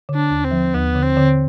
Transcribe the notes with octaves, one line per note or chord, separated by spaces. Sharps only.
D3
D4
D#2
C4
F3
D#2 B3
D3
C4
D3